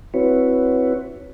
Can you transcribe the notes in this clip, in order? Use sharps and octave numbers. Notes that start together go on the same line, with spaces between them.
C4 E4 F#4 B4 C#5